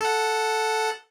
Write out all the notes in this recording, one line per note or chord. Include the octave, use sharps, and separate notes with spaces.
A4 F#5